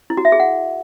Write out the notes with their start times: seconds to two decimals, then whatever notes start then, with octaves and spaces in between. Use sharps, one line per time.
0.10 E4
0.17 F#4
0.25 E5
0.32 G#4
0.40 F#5